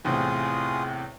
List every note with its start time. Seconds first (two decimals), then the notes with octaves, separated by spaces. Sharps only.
0.05 E2 A2 C3 F4 G#4 D#6